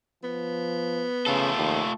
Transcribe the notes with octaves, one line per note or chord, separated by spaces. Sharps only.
F3 B3
C#3 A3 F4 A4
D#2